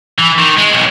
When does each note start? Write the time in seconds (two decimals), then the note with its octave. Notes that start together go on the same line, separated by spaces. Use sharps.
0.19 E3
0.39 D#3
0.58 G#3
0.72 B1